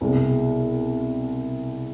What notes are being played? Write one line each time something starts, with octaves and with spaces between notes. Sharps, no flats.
C2 B2 G#3